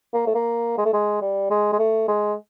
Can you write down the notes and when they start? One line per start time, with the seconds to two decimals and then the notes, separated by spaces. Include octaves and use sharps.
0.14 A#3
0.27 A3
0.35 A#3
0.78 G#3
0.85 A3
0.93 G#3
1.21 G3
1.50 G#3
1.73 G#3
1.79 A3
2.08 G#3